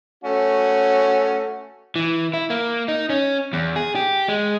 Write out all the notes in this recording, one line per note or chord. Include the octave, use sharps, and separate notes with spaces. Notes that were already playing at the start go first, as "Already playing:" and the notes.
A3 C#4 F#4
E3
E4
A#3
D#4
C#4
E2
G#4
G4
G#3